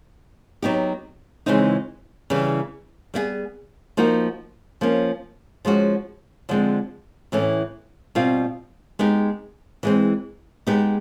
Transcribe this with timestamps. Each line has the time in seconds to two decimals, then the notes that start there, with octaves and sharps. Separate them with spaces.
0.62 F#3 B3 D#4 G4
1.46 C#3 E3 G#3 C4 D#4
2.30 C#3 E3 G3
3.14 G3 B3 E4 G#4
3.97 F3 A#3 D#4 F#4
4.81 F3 A#3 C#4
5.65 F3 G#3 C#4 F#4
6.49 D3 F3 G#3 C4
7.32 A2 E3 A3 C#4
8.15 B2 G3 C4 F4
8.99 G#3 B3 D#4 G4
9.83 E3 G#3 C4
10.67 G#3 B3 D#4 G4